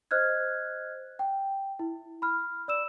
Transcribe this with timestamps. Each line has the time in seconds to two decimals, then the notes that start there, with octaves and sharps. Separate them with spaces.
0.11 C5 D#5 F6 F#6 G#6
1.19 G5
1.79 E4
2.22 B5 F6
2.68 D5 E6 E7